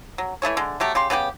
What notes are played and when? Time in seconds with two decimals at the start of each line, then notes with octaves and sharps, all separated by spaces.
0.18 F#3
0.42 E3 A3 G#4 C#5
0.57 D3 G#3
0.80 F#3 A3 G4
0.95 C#3 G4 C6
1.10 C#3 B3 D4 G4